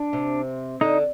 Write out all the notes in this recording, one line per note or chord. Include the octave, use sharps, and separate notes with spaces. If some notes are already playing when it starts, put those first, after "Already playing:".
Already playing: D4
C3
D3 D#4